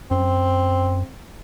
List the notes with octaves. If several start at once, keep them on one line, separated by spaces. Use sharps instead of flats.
F#2 C4